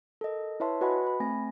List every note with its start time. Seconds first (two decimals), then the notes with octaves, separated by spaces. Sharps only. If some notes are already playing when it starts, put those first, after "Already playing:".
0.21 A4 A#4 D#5
0.60 E4 B4 C#5 E5 A5 C6
0.81 F#4 B4 D#5 F#5 G#5 B5
1.07 B5
1.20 A3 C4 G#5 A#6